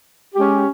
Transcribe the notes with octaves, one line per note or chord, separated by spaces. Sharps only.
G#3 C#4 G4